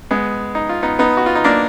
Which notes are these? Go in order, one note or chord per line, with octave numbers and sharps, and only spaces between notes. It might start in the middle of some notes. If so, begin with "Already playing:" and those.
G#3 B3
D#4
F4
B3 D#4
B3 D#4
F#4
F4
D#4
A#3 D4